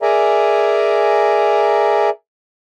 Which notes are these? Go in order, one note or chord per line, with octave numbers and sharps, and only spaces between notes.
G#4 A#4 D5 E5 G#5 A#5